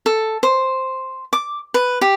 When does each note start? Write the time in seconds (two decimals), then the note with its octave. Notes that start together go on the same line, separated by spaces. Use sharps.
0.06 A4
0.43 C5
1.33 D6
1.74 B4
2.01 G4